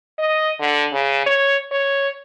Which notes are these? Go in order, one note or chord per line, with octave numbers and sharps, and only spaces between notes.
D#5
D3
C#3
C#5
C#5